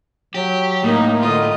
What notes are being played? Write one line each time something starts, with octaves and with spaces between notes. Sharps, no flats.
F#3 G4
A2 A#3 D#4
D3 F4 D#5